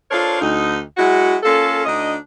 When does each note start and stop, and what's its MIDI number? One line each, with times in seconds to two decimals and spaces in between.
0.11 0.41 62
0.11 0.41 65
0.11 0.41 69
0.11 0.41 70
0.11 0.41 72
0.11 0.41 73
0.41 0.79 38
0.41 0.79 63
0.97 1.36 54
0.97 1.36 56
0.97 1.36 64
0.97 1.36 66
1.43 1.85 58
1.43 1.85 61
1.43 1.85 65
1.43 1.85 69
1.85 2.14 38
1.85 2.14 62
1.85 2.14 63
1.85 2.14 75